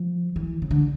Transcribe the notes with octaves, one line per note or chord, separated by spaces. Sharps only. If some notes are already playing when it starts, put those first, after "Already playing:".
Already playing: F3
E3
C#3
D3